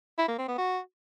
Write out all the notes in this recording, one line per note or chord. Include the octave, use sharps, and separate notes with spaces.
E4
A#3
C4
B3
F#4